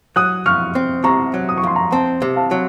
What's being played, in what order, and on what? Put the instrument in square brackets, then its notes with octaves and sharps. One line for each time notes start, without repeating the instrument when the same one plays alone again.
[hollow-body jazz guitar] F#3 [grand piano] D#6 F#6
[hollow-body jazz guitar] F2 [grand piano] C#6 F6
[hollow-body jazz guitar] C4
[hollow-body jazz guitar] C3 [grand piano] A#5 C#6
[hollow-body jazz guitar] F#3
[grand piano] D#6
C#6
[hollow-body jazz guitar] F2 [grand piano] C6
[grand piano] A#5 C#6
[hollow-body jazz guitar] C4 [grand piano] A5 C6
[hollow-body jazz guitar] C3
[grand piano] F5 A5
[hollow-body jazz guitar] F#3